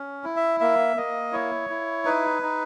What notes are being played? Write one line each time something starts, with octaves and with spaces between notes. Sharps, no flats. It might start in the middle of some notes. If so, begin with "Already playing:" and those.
Already playing: C#4
E4
E5
A#3 E5
A#3 D#5
E4 C#5
E4
D#4 B4
D#4